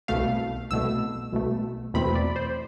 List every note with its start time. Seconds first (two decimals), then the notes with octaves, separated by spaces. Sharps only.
0.08 C2 B2 A3 F5
0.71 C2 B2 A3 E6
1.32 C2 B2 A3
1.94 E2 B2 A3 C4 B5
2.15 D5
2.36 C5